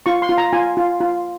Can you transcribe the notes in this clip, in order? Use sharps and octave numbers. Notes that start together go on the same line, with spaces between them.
F4 C#6
C6
F4
A#5
F4 G#5
F4
F4